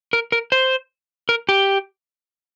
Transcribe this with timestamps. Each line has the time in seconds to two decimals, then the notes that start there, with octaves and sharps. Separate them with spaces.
0.13 A#4
0.32 A#4
0.52 C5
1.29 A#4
1.49 G4